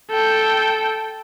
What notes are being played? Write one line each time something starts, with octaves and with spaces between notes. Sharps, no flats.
A4 G5